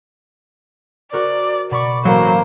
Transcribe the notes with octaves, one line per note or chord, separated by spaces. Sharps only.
F#4 A#4 C5 D5
B2 D5 B5 C#6
A1 F#3 A#3 C5